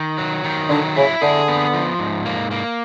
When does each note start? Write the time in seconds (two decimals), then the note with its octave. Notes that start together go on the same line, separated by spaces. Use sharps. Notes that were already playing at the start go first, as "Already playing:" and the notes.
Already playing: D#3
0.18 F#3
0.44 D#3
0.69 D3 F#3
0.96 C#3 E4
1.21 D3 G#4
1.48 B3
1.74 F3
1.99 G#2
2.25 A#3
2.51 A#3